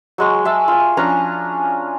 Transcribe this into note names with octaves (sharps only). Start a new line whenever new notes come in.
F#3 G#3 C#6
G#4 E5 A5
F4 G#5
F3 C#4 D4 A#5